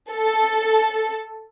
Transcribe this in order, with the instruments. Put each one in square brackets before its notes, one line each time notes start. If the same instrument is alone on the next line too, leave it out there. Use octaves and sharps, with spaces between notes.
[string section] A4